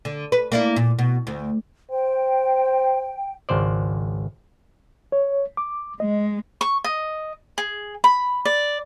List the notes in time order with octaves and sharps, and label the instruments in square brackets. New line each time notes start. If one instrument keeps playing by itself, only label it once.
[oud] D3
B4
A#3 D4 E4
A#2
B2
D2
[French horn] C5 [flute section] G5
[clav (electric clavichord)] G#1 C#2 C5 D5
[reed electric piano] C#5
D6
[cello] G#3 [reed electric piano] D#5
[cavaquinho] C#6
D#5
G#4
B5
D5